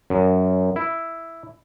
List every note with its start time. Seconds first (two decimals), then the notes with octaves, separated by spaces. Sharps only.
0.10 F#2
0.76 E4